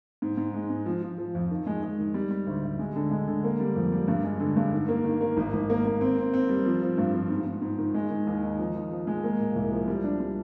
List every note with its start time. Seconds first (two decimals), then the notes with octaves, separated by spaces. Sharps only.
0.22 G#2
0.37 G#2
0.54 G#3
0.70 G#2
0.86 F3
1.02 F3
1.18 F3
1.35 F2
1.51 D#3
1.67 G#3
1.83 G#3
1.99 D#3
2.14 G3
2.31 G3
2.47 D2
2.63 D2
2.79 G#3
2.96 D3
3.11 G#3
3.28 D3
3.44 A#3
3.60 G3
3.76 F2
3.92 G3
4.08 G2
4.24 G#3
4.40 D3
4.57 G2
4.73 D#3
4.88 A#3
5.05 D#3
5.21 A#3
5.37 G#1
5.53 G#1
5.70 A#3
5.85 A#3
6.01 C4
6.17 C4
6.34 C4
6.49 G3
6.66 F3
6.82 F3
6.98 G2
7.14 F3
7.30 G#2
7.46 G#2
7.62 G#2
7.78 D#3
7.94 G#3
8.10 D#3
8.27 D#2
8.43 D#4
8.59 F3
8.75 F3
8.91 F3
9.07 G#3
9.24 A#3
9.39 A#2
9.55 C2
9.72 F3
9.88 G3
10.04 D4
10.20 G3